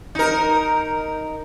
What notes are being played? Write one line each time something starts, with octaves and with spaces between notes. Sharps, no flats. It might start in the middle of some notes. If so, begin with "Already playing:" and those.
D#4 A#4